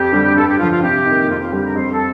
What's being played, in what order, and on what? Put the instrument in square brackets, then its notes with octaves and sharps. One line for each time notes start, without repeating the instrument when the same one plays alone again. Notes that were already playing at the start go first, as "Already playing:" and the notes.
Already playing: [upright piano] F2 [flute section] G4
[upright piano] D3 G3
[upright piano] G2 [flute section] A4
[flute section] G4
[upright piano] D3 F3 [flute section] F4
[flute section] F4
[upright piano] C3 [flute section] G4
[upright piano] D#3 A#3
[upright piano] F2 [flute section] F4
[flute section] F4
[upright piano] D3 G3 [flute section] G4
[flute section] A#4
[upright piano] F2 [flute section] C5
[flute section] A4